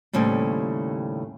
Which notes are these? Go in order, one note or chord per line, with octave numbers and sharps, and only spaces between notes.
D#2 A2 C#3 G3 C4